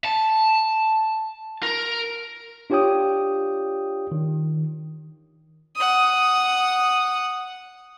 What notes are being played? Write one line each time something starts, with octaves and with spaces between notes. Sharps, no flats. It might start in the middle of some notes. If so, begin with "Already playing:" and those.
A5
A#4
D4 F4 G4 C#5 G5 D#6
D#3
F#5 D#6